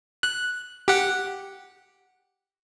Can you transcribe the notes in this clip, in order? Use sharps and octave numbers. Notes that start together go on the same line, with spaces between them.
F#6
G4 F#5